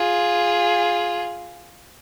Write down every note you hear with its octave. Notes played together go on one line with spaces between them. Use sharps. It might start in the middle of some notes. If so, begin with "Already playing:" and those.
Already playing: F4 G#4